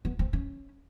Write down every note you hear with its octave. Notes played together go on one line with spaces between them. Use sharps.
B3
C4
C#4